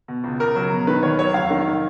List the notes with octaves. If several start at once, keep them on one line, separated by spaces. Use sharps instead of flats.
B2
C#2
C#2 A#4
F#3
B2
D#3 B4
D#2 C#5
F#3 C#5
F1 F5
D#3